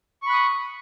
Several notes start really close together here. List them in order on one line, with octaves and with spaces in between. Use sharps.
C#6 B5 F#6 D#6